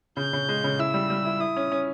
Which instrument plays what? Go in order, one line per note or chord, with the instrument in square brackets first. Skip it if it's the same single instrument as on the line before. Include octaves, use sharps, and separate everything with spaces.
[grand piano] C#3 [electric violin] G6
[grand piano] C#3
G#3
C#3
[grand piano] E4 [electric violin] E6
[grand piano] G3
G3
E4
[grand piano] E4 [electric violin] D#6
[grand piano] C#4
C#4